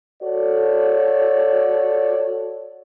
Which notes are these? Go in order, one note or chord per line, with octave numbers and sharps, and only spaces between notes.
F#4 A4 C#5 D5